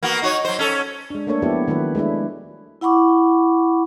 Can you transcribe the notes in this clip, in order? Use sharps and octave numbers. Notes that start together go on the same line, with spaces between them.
A#3 B3 F#4
D#4 F#4 C#5
F#3 C5
C#4 A4
G#3 D4
A3 A#3 D4 A4 C#5
F3 B3 E4 G4 A4
D#3 F#3 A3 E4 B4
G#3 A3 D4 E4
E4 F#5 B5 C#6 D6